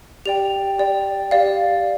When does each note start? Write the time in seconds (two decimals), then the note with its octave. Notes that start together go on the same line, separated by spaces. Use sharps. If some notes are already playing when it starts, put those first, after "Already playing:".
0.26 G4 D5 G5 F7
0.78 G4 D5 G5
1.31 G4 D5 F5